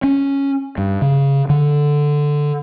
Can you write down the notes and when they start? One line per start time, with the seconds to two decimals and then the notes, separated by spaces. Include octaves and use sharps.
0.03 C#4
0.78 G2
1.02 C#3
1.50 D3